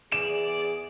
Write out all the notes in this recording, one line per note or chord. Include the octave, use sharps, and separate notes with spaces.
E2 G#4 D5 E7